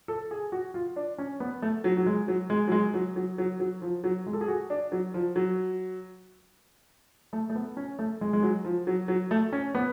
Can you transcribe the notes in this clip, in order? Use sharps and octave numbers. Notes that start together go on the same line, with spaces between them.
A4
G#4
F#4
F4
D4
C#4
B3
A3
F#3
F#3
G#3
F#3
G#3
F#3
G#3
F#3
F#3
F#3
F#3
F3
F#3
G#3
A4
G#4
F#4
D4
F#3
F3
F#3
A3
A3
B3
C#4
A3
G#3
G#3
F#3
F3
F#3
F#3
A3
C#4
B3